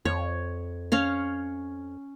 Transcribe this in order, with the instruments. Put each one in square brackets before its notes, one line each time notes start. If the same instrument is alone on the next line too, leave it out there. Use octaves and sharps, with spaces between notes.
[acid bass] F2 [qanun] C#5
[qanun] C#4 C#5 F5